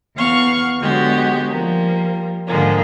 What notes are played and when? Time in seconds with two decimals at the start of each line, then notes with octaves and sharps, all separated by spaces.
0.16 E2 B3 F5 F#5 C#6 F6
0.79 D3 F#3 G#3 B3 F#4 G4
1.50 F3 G3 A#3
2.48 G#2 D3 F3 G#3 A#3